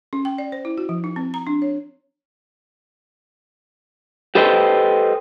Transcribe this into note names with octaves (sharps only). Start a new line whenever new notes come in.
C#4
G5
D5
C5
E4
F#4
F3
D#4
C4
A#5
D4
C#5
G4 A4 B4 C5 D#5 G5